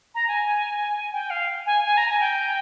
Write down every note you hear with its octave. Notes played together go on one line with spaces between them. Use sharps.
A#5
G#5
G5
F5
G#5
G#5
A#5
G#5
G5